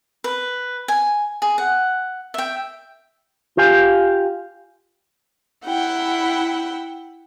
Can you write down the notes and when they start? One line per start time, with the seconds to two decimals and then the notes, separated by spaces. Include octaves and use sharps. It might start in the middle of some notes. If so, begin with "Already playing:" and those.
0.24 B4
0.88 G#5
1.42 G#4
1.58 F#5
2.34 E5 G5
3.57 F4 G4 F5 G#5
5.65 E4 F#5 G5